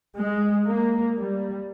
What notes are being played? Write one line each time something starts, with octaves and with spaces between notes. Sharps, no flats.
G#3
A#3
G3